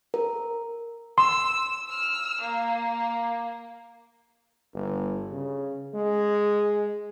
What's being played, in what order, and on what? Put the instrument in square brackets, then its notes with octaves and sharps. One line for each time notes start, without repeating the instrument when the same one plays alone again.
[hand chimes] A#4
[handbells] C6 [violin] E6
[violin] E6 F6
A#3
[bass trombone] G1
C#3
G#3